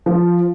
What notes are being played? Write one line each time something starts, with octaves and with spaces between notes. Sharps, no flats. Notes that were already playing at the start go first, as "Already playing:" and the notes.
F3